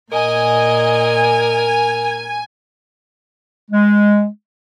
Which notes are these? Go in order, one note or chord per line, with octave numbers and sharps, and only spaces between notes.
A#2 A#4 D#5 G#5
G#3